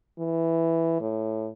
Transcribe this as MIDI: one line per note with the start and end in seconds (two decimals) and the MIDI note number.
0.19 0.98 52
1.00 1.48 45